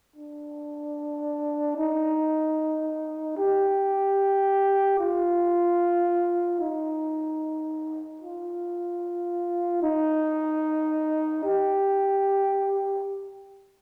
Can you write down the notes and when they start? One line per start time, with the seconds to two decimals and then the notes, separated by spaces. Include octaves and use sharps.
0.16 D4
1.77 D#4
3.38 G4
4.99 F4
6.60 D#4
8.21 F4
9.82 D#4
11.44 G4